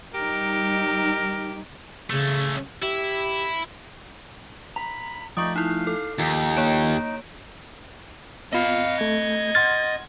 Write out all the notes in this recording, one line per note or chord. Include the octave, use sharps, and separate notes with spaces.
G3 D#4 G4 A#4
C#3 A3 C#4
E4 G4
A#5 B5
F3 A3 D#4 D5 G5 C#6 D#6
D#4 E4 F5
A4
D#2 D#3 F3 D#4
A#3 C#5 D7
B3 F4 D#5 F5 B5
A3 G#6
F#5 C6 F6 A6